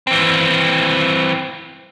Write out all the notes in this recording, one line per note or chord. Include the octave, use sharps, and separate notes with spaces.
E3 C4